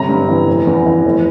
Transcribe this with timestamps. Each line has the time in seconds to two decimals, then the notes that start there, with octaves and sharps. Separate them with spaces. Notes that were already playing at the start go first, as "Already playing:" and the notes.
Already playing: G1 C3 A#5
0.09 G2
0.29 E3
0.48 F1
0.67 E2
0.86 E3
1.05 F1